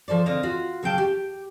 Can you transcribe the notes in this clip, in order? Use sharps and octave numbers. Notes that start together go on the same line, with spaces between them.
F3 A4 C5 D5
D3 C4 D#5 F5
F4 F#4
C#3 F#3 F5 G5 A5
G4